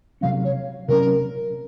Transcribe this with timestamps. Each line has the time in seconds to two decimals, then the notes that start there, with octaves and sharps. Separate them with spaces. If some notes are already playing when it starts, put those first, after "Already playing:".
0.21 C3 F#3 C#4 F5
0.44 C#5
0.88 C3 F#3 C#4 A#4